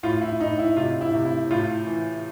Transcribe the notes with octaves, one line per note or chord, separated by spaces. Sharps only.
A2 F4
E4
A2 D#4
E4
C3 F4
E4
C3
E4
A2 F4
E3